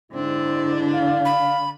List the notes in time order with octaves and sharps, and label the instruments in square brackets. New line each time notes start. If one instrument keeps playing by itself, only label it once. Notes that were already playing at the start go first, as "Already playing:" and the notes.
[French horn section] G#2 E4 [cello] D3 D4 [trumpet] C4
[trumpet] F5
[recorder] B5